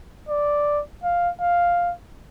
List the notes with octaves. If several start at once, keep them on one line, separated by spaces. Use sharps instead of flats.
D5
F5
F5